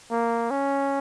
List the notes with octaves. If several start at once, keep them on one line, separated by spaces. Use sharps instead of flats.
A#3
C#4